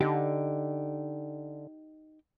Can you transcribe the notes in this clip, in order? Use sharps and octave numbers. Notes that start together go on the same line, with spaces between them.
D3 D#4 G4